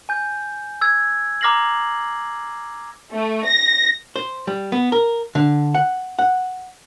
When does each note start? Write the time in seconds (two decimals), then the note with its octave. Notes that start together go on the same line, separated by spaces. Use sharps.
0.09 G#5 G6
0.81 E6 G#6
1.41 A#5 D6 F6 A#6 C7 F#7
3.12 A3
3.47 A#6
4.16 C5
4.47 G3
4.72 B3
4.92 A#4
5.35 D3
5.75 F#5
6.19 F#5